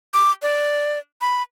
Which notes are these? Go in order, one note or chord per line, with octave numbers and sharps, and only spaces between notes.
D6
D5
B5